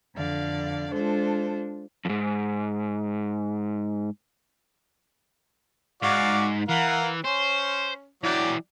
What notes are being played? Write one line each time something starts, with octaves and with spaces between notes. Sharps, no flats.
F2 D3 D5 F5
G#3 D4 F4 A4 C5
F2 G#2
G#2 F#4 D5 F5
E3 A#4 F5 F#5
C#4 C5
E3 F#3 D5 G5